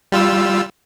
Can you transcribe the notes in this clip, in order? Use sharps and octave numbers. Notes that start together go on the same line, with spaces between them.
G3 F4 E6